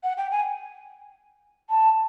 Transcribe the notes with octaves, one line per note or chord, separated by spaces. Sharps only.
F#5
G5
G#5
A5